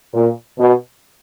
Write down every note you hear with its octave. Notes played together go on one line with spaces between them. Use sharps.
A#2
B2